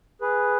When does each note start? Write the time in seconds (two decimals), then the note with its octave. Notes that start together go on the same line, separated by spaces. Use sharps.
0.21 G#4 B4